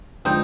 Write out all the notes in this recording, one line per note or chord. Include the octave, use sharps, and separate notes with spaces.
D3 G#3 C4 D4 D#4 F4